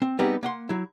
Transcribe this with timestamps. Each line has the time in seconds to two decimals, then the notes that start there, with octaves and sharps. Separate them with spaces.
0.02 C4
0.19 G3 B3 C4 D#4 G4 G#4
0.43 A#3 F#5 C6
0.69 F#3 E4